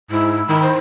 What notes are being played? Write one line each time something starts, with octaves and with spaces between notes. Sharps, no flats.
G#2 E4
D#3 B5
C5